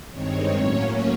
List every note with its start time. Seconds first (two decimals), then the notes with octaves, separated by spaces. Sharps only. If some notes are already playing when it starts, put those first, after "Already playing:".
0.11 G2 D#3 G#3 C4 C#5
0.56 A2 F#3 A#3 C#4